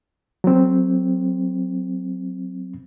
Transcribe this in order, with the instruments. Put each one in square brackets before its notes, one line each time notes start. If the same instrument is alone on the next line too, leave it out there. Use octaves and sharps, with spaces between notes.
[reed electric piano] F#3 C4